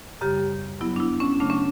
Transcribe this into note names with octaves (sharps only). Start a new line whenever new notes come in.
F#2 C#3 G3 G4
G2 F#3 B3 E4
D4
E4
C#4
C#3 F#3 A3 D4
C#4